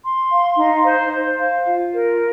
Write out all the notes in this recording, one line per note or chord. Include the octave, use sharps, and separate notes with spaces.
C6
F5
D#4
C5
C5
F5
F4
A#4